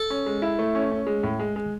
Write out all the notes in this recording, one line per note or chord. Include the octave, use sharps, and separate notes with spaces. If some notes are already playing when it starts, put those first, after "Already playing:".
Already playing: A4
C#4
G#3
E4
A3
C#4
C#4
G#3
A2
G#3
G#3